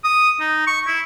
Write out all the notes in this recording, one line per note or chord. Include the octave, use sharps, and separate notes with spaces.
D#6
D#4
C#6
E4